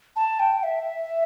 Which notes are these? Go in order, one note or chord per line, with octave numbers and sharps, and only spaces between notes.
A5
G5
E5